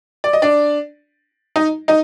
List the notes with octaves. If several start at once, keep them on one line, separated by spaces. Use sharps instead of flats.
D5
D#5
D4 D5
D#4 D#5
D#4 D#5